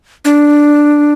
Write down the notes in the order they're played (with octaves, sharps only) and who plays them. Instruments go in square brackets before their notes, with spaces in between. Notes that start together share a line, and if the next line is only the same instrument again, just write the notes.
[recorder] D4